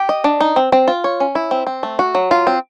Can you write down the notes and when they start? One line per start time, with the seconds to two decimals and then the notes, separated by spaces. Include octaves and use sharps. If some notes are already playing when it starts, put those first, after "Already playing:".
Already playing: G4
0.09 D#5
0.24 D4
0.41 D#4
0.56 C4
0.72 C4
0.88 F4
1.04 C#5
1.20 C#4
1.35 E4
1.51 C4
1.67 C4
1.83 A3
1.99 F#4
2.15 F#3
2.31 F4
2.47 C4